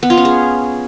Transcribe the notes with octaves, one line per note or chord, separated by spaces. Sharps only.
B3
F4
C#4
G#4